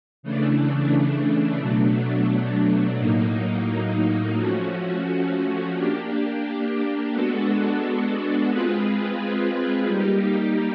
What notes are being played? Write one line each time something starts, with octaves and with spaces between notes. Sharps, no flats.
C#3 E3 A3 D4
B2 F#3 A3 D4
A2 F#3 A#3 D#4
F3 A3 C#4 F#4
A#3 D4 G4
G#3 B3 D4 F#4 A4
G#3 C4 F4 G#4 B4
G3 A#3 D#4 G4